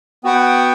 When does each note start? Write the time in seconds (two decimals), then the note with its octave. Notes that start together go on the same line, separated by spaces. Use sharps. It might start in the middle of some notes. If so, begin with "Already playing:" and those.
0.24 B3 F#4 B4 F#5 G5
0.38 G5